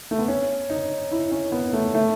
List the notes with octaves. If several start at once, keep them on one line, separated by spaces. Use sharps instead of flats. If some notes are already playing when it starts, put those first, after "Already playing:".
A3
B3
C#4
D#4
E4
C#4
B3
A3
A3